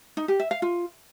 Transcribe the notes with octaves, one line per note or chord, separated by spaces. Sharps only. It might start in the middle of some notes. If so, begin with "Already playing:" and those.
D#4
G4
E5
F5
F4